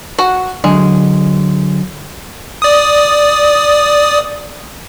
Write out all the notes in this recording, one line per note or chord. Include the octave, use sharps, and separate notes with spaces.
F#4 F#5
D3 F#3 G#3
D5 D#6